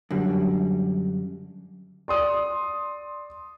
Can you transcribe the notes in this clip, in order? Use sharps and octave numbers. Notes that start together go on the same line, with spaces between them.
F#2 D3 G3
D5 C6 D#6